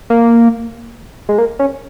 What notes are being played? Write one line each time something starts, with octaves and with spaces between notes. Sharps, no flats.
A#3
G#3
A#3
C#4